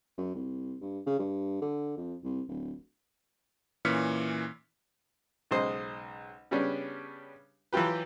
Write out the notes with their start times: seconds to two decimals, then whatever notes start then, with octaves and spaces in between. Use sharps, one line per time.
0.17 F#2
0.35 C2
0.81 G2
1.06 C#3
1.19 G2
1.61 D3
1.97 F2
2.24 C2
2.48 D1
3.85 A#2 E3 C#4 F6 B6 C#7
5.51 B1 C#3 G#3 C5 D#5
6.51 C#3 G3 B3 C#4 D4
7.73 E3 F#3 F4 G4 B4